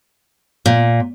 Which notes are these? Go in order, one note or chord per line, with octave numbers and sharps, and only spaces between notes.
A#2